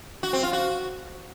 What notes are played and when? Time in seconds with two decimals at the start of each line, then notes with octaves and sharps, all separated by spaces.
0.23 F#4
0.33 C4
0.43 F4
0.53 F#4